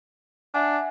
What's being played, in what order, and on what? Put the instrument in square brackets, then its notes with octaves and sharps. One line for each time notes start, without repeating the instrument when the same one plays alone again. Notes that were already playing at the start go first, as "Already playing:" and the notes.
[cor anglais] D4 [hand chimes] E5 F#5 G#5